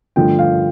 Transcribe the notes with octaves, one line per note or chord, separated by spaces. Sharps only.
G2 D3 F3 A3 G5
F5